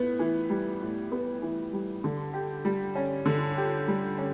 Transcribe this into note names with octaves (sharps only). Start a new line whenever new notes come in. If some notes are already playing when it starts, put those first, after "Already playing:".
Already playing: A2 B3
E3
G3
A2
B3
E3
G3
D3
G4
G3
C#4
D3
G4
G3
C#4